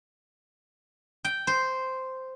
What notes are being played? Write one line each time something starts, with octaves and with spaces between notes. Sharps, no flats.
G5
C5